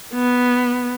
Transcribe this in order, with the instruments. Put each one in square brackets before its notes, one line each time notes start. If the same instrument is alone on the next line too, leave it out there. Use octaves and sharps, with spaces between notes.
[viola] B3